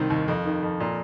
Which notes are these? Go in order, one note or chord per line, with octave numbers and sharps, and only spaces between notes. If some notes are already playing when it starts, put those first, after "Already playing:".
Already playing: C2 D#3 C4
D#2
F2
D#3
F2
A#2